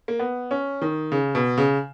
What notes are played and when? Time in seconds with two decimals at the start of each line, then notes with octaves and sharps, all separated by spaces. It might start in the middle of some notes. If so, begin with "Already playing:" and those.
0.08 A#3
0.19 B3
0.51 C#4
0.82 D#3
1.12 C#3
1.35 B2
1.58 C#3